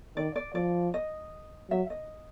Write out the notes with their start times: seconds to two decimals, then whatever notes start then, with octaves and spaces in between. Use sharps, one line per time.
0.16 D#3 D5
0.36 D5
0.55 F3 D5
0.94 D#5
1.71 F#3 E5
1.90 D#5